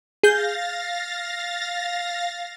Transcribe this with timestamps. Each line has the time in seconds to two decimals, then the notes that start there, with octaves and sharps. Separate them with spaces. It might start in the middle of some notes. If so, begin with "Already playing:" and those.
0.23 G#4 F5 G6 A6 A#6